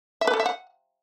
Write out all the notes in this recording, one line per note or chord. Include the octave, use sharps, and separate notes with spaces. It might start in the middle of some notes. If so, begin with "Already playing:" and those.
E5
B4
A4
E5
F#5